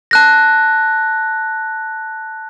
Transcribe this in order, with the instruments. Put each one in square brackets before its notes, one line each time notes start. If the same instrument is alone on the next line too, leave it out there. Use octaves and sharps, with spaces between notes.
[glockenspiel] A5 F#6 A#6